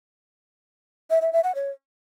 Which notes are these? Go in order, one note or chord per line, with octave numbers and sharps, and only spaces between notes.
E5
E5
E5
F#5
C#5